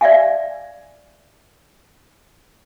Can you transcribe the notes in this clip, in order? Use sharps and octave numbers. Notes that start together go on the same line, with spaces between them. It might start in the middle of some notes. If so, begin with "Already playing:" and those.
D5 E5 F5 G#5